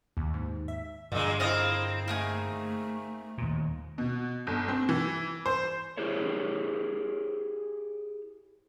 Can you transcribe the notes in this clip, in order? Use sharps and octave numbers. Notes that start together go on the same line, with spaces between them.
D#2
G#2
E5
G2 A#2 D3 G#3
C4 E4 F4 A#4 D#5
A3 A#3 D#4 G#4
D#2 A#2
B2
G1
C4
E3
C5
E4 G4 G#4 A#4 C5 C#5